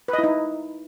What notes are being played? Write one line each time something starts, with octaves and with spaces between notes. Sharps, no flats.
B4
D#5
E4
D#4